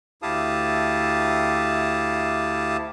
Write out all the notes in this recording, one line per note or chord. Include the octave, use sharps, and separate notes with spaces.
D2 E4 G4 F5 A5 D#6